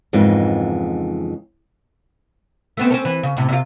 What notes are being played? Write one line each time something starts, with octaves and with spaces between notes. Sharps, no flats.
F2 G#2 C#3 E3 A#3 D#4
A3 B3 C4
C4 C#4 A4
E3
C#3
A2 C3
C3 F4